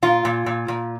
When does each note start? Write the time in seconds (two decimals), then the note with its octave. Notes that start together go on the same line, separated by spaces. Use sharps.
0.02 A#2 F4
0.25 A#2
0.46 A#2
0.68 A#2